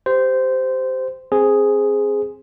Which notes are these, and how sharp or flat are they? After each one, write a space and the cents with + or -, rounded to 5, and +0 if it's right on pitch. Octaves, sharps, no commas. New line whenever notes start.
G4 +0 C5 -15
C4 +25 G#4 +0 C5 +0